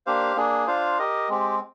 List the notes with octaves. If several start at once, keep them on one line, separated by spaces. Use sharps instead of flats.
A#3 D4 G4 C5 F5
A#3 D4 G#4
D4 F4 C5 F5
G4 A#4 D#5
G#3 C4 G4